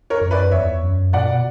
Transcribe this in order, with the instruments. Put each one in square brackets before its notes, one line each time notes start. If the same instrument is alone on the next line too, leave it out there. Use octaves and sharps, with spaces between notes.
[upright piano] A#4 C#5
[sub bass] F#2
[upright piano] B4 D5
[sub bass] E2 [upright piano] C#5 E5
[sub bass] F#2
[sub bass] A#2 [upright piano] D5 F#5
[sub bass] B2